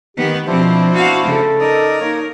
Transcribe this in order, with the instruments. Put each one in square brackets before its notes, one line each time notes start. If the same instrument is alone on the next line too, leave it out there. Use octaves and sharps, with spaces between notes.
[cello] D#3 B3 [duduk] G4
[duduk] B2 [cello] F3 C4 [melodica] D4 E4 C5
[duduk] B3 [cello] F#4 F5
[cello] C#3 [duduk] A4
[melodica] D#4 D5 D#6 [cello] A#4
[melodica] A#3 C#5 [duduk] D#4